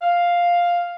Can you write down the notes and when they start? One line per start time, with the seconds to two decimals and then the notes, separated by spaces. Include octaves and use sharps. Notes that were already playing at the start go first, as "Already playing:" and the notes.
0.02 F5